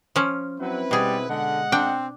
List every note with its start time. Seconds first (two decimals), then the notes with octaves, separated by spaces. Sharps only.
0.16 F3 C#4
0.60 F#3 C4 E4 B4
0.91 B2 G3 G#4
1.29 D3 G#3 D#5 F#5
1.72 C4 D4 G5